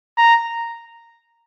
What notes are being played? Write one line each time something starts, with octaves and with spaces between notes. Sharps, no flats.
A#5